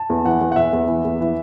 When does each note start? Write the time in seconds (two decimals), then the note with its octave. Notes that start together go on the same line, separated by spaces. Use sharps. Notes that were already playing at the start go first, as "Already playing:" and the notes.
Already playing: A5
0.10 E2
0.25 E3 F#5
0.41 E2
0.52 F#5
0.56 E3 E5
0.73 E2
0.88 E3
1.05 E2
1.21 E3